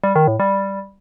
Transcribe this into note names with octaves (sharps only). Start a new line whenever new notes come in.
G3
D#3
A2
G3